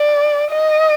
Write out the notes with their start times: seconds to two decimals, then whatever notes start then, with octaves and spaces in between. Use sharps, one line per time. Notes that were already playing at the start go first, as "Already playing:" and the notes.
Already playing: D5
0.51 D#5